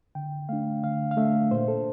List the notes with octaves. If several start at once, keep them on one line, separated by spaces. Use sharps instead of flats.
D3 G5
A3 D4 F5
D3 F5
F5
A3 D4 E5
A#2 C5
A4